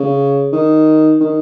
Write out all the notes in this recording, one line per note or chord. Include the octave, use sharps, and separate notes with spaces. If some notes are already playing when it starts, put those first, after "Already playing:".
Already playing: C#3
D#3
D#3